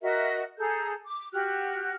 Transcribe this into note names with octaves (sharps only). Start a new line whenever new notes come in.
F#4 A#4 D#5 E5
G#4 A4 A#5 G6
D6
F#4 G4 F6 F#6